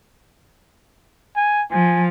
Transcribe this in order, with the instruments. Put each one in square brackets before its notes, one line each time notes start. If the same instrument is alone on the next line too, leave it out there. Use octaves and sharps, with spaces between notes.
[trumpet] G#5
[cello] F3 [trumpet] G#5